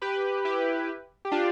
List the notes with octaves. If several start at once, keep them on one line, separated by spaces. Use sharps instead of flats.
G4 B4
E4 G4
G4
D4 F4